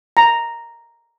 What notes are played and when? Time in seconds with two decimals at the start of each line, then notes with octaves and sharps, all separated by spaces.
0.17 A#5